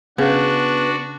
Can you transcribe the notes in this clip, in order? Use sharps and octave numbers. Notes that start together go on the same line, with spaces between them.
C#3 B3 D4 F#4